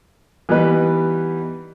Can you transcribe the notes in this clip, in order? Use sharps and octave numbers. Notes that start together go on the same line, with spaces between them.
E3 G3 B3 D#4 B4